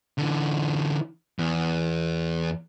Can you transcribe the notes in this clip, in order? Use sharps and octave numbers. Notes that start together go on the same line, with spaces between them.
D3 E3
E2